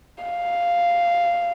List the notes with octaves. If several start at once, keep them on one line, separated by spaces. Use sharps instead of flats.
F5